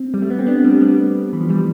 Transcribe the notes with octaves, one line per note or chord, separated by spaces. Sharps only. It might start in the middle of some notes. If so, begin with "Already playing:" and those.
Already playing: C4
G3
A3
B3
C4
B3 D4
G3 B3
G3 B3
E3
F3
E3 G3